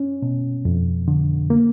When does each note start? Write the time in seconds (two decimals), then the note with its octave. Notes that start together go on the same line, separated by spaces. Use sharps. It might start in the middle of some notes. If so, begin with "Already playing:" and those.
Already playing: C#4
0.22 B2
0.65 F2
1.08 D3
1.50 A#3